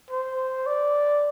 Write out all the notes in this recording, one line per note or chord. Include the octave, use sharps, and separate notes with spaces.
C5
D5